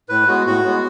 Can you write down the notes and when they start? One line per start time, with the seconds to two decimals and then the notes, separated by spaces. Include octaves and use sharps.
0.09 A2 B4
0.28 G#3 B3 F#4
0.46 A2 F#4
0.65 G#3 B3